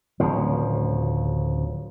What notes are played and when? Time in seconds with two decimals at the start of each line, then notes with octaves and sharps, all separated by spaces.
0.20 D1 D2 C#3 F3